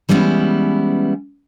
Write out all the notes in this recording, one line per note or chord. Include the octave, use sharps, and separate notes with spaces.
E3 G3 G#3 B3 C#4 E4